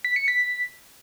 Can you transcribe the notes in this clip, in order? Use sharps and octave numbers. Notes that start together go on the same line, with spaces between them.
B6
C#7
B6